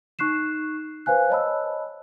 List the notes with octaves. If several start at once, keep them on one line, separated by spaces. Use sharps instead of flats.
D#4 C#6 F#6 C7 E7
B4 C5 F5 G#5 F#6
C#5 D#5 A5 B5 E6